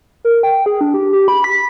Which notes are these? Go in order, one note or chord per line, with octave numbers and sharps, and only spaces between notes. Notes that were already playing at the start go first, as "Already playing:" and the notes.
A#4
G5
G#4
D4
G4
G4
B5
B6